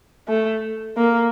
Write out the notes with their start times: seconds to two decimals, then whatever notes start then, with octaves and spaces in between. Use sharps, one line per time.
0.28 A3
0.97 A#3